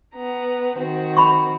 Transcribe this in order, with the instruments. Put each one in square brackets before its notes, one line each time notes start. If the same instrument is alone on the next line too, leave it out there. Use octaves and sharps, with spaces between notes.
[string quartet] B3 A#5
D#3 C4 F#4
[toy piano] B5 C#6